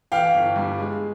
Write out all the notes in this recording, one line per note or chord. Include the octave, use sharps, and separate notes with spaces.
E3 F5 G5
G1
G2
G#3